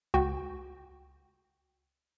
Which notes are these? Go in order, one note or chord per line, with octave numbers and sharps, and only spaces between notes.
C#2 F#4 G5